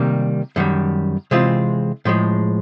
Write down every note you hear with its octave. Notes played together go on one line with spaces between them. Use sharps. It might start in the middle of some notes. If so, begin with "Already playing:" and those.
Already playing: C3 D#3 G3 A#3
F#2 D#3 G3
C3 E3 G#3 C4 F4
A2 F3 G#3